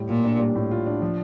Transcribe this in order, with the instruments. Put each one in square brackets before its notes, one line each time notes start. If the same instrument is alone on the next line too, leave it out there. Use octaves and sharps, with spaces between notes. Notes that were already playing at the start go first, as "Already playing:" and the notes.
Already playing: [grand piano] A2 G3
[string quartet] A#2 [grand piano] F4
[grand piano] D4
G3
A2
F4
D4
F3